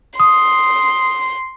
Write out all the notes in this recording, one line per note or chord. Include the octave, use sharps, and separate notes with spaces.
C6 D#6